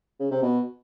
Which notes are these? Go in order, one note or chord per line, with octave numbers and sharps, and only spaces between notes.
C#3
C3
B2